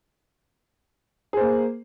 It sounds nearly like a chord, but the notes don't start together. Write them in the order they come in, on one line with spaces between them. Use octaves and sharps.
G#4 C5 A#3